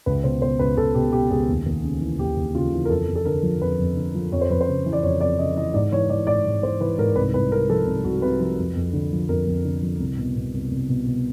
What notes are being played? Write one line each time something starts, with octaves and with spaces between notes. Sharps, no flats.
C#2 B4
B2 C5
B2 C5
C#2 B4
C#2 A4
B2 G4
B2 G4
C#2 G#4
D#2
D#2
C#3
E3
D#2 G4
D#2
C#3 F4
E3
A#4
F2 A4
F2
A4
D3 A#4
F3
F2 B4
F2
D3
F3
F2 C#5
C5
F2 B4
C5
C#3
E3
D5
F2 C#5
F2 D5
C#3 D#5
E3 D#5
G#2 D5
E3 C#5
E3 D5
G#2 D5
G#2
E3 C5
E3 B4
G#2 A#4
C2 B4
C2 B4
C3 A#4
F3 A4
C2
C2 F#4
C3 B4
F3 B4
F2
F2
D3
F3
F2 A#4
F2
D3
F3
C2
B2
B2
C2
C2
B2
B2